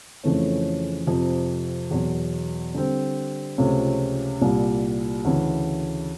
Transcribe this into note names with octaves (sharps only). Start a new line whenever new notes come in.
F2 C#3 E3 A3 C#4
F2 C3 F3
E2 B2 F#3
D3 G3 C4
C#2 C3 F3 A3 C#4
C2 A#2 G3
D2 C#3 E3